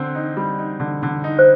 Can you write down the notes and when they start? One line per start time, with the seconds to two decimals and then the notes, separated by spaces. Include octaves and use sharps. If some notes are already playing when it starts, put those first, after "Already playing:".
Already playing: D3 C4
0.15 D#4
0.37 G3
0.59 D#4
0.80 D3
1.03 D3
1.24 D#4
1.39 C5